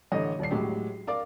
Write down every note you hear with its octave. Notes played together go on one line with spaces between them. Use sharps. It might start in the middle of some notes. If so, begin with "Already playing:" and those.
A1 D3 D#5
D#1 D5 C7
A2 F#3 G#3 G4
A#4 D5 F5 D6